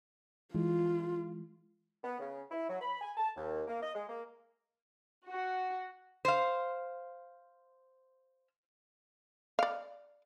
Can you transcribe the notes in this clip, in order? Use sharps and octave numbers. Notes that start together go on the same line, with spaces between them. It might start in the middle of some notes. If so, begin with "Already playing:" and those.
E3 G#3 F4
B3
C#3
E4
F#3
B5
G#5
A5
D#2
A#3
D#5
G#3
A#3
F#4
C5 F5
D5 F5